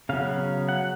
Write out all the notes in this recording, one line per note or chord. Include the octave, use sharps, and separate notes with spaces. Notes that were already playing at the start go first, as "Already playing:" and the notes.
C#3 F#3 B3 F5
F#5